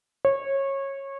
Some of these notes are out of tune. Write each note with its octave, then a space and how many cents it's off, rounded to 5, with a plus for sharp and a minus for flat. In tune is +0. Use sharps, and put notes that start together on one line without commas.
C#5 -20